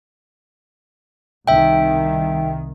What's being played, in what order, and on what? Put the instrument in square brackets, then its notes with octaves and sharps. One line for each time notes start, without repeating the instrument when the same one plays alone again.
[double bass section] C2 D#3 [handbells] E5 G5